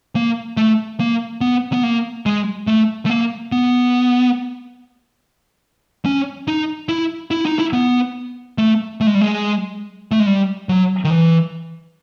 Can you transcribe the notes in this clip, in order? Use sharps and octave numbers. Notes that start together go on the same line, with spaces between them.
A#3
A3
A#3
B3
B3
A#3
G#3
A3
A3
A#3
B3
C#4
D#4
E4
E4
D#4
E4
B3
A3
A3
G#3
G3
G#3
A3
G#3
G3
F#3
D#3
E3